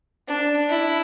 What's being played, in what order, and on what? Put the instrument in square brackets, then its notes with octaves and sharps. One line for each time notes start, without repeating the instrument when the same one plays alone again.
[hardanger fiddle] D4
E4